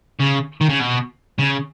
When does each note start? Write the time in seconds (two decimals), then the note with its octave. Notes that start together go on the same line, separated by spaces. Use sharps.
0.20 C#3
0.61 D#3
0.69 C#3
0.80 B2
1.39 C#3